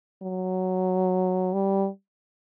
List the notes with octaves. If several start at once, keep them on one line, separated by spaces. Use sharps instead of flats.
F#3
G3